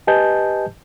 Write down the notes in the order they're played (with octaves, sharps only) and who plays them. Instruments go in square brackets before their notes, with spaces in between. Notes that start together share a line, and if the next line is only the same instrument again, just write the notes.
[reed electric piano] G4 B4 D#5 G#5 A5 G6